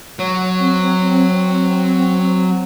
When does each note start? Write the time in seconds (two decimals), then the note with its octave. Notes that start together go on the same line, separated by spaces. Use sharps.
0.19 F#3
0.58 C4